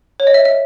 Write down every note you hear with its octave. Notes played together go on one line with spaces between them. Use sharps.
C#5
D#5
E5
E5